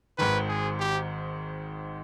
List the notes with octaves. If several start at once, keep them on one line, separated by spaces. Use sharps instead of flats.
G#1 G#2 D#3 B4
G#4
G4